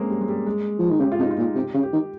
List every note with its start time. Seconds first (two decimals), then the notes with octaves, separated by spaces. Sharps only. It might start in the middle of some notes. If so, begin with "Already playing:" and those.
Already playing: G#3 A#3 C4 C#4
0.10 G3
0.21 G#3
0.28 G3
0.46 G#3
0.79 F3
0.90 D#3
1.00 C#3 G4
1.12 F4
1.19 C3 D#4
1.31 F4
1.38 A#2
1.55 C3 G4
1.74 C#3
1.83 G4
1.93 D#3